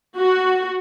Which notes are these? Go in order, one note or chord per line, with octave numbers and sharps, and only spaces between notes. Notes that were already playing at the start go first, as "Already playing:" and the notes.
F#4